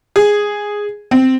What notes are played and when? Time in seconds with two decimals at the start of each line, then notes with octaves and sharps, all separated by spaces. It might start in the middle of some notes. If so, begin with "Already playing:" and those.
0.16 G#4
1.11 C4